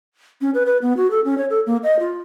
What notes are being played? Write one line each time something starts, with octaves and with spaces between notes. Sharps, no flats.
C#4
B4
B4
B3
F#4
A4
C#4
C#5
A4
A#3
D#5
F4